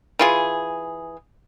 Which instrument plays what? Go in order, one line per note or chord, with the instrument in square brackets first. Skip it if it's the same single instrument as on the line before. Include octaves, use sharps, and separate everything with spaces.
[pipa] E3 F4 G#4